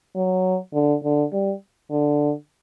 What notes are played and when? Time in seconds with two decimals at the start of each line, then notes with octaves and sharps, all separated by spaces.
0.16 F#3
0.74 D3
1.03 D3
1.32 G3
1.90 D3